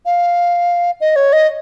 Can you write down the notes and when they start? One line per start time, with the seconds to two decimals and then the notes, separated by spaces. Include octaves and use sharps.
0.05 F5
1.01 D#5
1.16 C#5
1.33 D#5